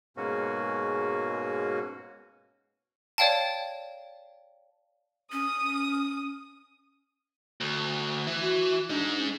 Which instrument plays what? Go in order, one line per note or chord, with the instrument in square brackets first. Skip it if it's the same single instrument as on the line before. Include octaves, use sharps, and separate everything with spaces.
[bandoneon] G#2 B2 G#3 A#3 C#4 F#4
[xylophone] C#5 D5 F5 G5 A5
[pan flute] C#4 [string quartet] D#6
[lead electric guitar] D2
E3
[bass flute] F#4
[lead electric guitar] G#3 D#4 [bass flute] D4
[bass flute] C#4